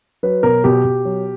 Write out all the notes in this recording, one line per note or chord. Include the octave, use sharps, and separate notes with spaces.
F#3 B4
B2 A#4
B2 G4
B2
F#3